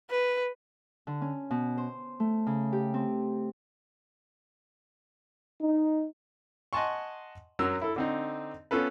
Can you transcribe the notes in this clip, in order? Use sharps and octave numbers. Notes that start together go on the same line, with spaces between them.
B4
D3
C#4
B2
C5
A3
C#3
G4
C4
D#4
D#5 F#5 G#5 A5 C6 C#6
F#2 F#3 A#4 E6
E4 A4
D3 C4 D#4
B3 C#4 F4 A4 B4